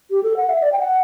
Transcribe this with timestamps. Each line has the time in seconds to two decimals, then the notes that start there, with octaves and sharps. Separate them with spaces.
0.11 G4
0.23 A4
0.37 F#5
0.49 E5
0.62 D5
0.72 G5
0.79 F#5